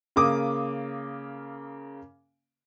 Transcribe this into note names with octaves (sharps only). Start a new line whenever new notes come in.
C#3 A#3 D6 D#6